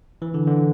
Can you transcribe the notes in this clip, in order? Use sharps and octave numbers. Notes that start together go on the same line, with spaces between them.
E3
D3
D3